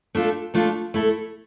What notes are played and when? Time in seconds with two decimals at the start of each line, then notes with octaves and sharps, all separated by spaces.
0.15 A3 D4 F4 A4
0.54 A3 D4 F4 A4
0.94 A3 E4 A4